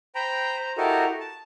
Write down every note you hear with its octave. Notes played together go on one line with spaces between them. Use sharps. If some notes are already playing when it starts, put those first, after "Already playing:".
C5 G5 A#5 B5
C5 A#5
E4 F#4 G4 A4 A#4 D#5
A5